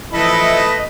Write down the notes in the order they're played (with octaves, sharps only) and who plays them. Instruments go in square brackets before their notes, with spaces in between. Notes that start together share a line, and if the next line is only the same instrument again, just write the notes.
[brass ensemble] E3 F3 E4 [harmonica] A3 A4 B4 [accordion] D#5 B5